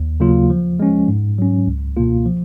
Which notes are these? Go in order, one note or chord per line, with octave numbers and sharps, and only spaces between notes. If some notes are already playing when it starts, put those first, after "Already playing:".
Already playing: D#2
C#3 F#3 A#3 F4
F3
G#3 C#4
G#2
F#3 C#4
C#2
B2 A#3 F4
F3